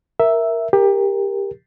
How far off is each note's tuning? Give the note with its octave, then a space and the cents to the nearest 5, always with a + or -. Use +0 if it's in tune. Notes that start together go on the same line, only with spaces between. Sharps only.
A#4 +0 E5 +0
G4 +20 A#4 +0